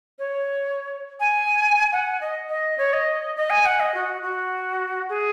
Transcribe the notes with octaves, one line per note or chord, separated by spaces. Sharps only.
C#5
G#5
F#5
D#5
D#5
C#5
D#5
D#5
G#5
F#5
D#5
F#4
F#4
G#4